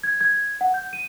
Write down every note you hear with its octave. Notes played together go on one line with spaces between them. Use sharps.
G#6
G#6
F#5
G6
D#7